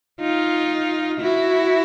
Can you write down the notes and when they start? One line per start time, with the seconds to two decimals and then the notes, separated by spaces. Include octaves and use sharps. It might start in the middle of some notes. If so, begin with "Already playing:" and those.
0.21 D#4 F4
1.20 E4 F#4